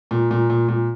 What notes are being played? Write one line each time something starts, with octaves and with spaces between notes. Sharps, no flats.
A#2
A#2
A#2
A#2